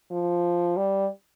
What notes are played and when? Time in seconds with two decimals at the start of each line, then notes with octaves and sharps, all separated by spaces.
0.11 F3
0.77 G3